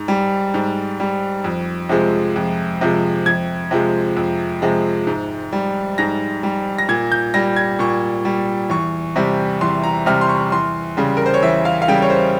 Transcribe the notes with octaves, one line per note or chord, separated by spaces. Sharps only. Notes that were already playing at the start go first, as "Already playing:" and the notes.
Already playing: G#2
G3
G#2
G3
F2
C3 F3 G#3
F2
C3 F3 G#3
F2 G#6
C3 F3 G#3
F2
C3 F3 G#3
G#2
G3
G#2 A#6
G3
A#6
A#2 G#6
G6
G3 A#6
G#6
A#2 C#6
G3
E2 C#6
C3 G3
E2 C6
A#5
C3 G3 F6
C6
C#6
E2 C6
C#3 G3
A#4
C5
C#5
E2 E5
F5
F5
C#3 G3 G5
C#5
C5